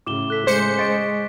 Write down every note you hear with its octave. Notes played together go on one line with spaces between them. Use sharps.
A2 C#3 D6 E7 G7
A4 F#6 B6
G#3 C5 B6 C#7
D#5 C6 C#6 A6 B6 D7